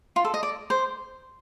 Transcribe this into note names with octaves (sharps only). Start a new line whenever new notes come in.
F4
A4
D#5
D5
C5